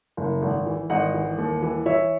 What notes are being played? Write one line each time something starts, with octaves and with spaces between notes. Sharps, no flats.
F#1
G#1
E3
G#1 D#5 F#5
E3
D#2
E3
E3 C#5 E5